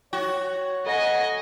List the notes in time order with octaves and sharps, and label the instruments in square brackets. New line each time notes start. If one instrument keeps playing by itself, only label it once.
[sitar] F#4 [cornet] C#5 [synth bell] G5
[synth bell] A4 A#6 [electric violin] D#5 G#5 [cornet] F#5